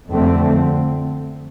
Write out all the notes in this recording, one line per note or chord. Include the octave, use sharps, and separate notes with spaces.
F2 D3 A3 C4